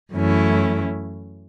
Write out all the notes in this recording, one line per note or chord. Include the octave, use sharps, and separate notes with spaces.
F#2 E3 A3 C#4 E4